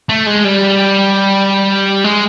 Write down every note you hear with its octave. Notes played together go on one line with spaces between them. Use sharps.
A3
G#3
G3
G#3